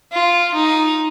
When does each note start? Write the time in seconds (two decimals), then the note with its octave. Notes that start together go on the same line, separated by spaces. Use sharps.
0.12 F4
0.54 D#4